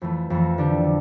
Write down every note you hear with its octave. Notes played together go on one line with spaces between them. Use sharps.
F2 E3 A3
F2 E3 A3
D3 A3 D4 G4
D3